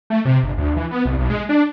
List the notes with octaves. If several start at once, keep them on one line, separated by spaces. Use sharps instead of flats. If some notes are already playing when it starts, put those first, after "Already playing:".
A3
C3
G1
D2
E3
B3
C2
B1
G#3
D4